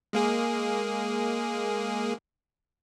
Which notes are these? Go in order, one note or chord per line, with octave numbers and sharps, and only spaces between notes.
G#3 A#3 G#4